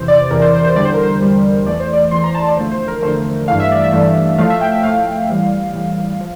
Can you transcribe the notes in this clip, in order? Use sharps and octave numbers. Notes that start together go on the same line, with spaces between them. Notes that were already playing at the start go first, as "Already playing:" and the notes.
Already playing: E2 C3 E3 C5
D5
E2 C3 E3 A#4
C5
C5
C5
E2 D3 G3 D5
C5
A#4
C5
E2 D3 G3
E2 E3 A3 D5
C5
D5
E2 E3 A3 C6
A#5
A5
D5
E2 D3 F3 A3 C5
C5
A#4
E2 D3 F3 A3 C5
G2 E3 A3 F5
E5
D5
E5
G2 E3 A3
A2 F3 A3 F5
E5
G5
E5
A2 F3 A3 F5
A2 E3 G3
A2 E3 G3
F3